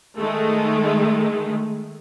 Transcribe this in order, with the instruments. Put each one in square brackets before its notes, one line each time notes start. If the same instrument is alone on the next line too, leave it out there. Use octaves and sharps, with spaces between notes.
[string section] D#3 G#3 A3